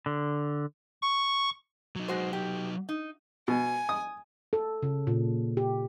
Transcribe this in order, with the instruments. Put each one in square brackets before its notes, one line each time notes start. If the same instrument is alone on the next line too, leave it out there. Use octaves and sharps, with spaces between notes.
[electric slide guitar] D3
[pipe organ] C#6
[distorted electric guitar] F#3 D#4
[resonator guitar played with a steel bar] G#3 F#4 C5
G4
D#4
[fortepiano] B2 [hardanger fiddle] G#5
[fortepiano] D#6
[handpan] A4
C#3
A#2
G4